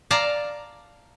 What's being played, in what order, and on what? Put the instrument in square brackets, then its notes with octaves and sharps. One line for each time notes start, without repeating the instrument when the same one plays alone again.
[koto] D5 F5 A5 A#5